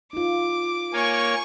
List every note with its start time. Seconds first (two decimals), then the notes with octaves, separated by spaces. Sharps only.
0.13 D#4 F4 D6
0.93 A#3 C#5 G#5 C#6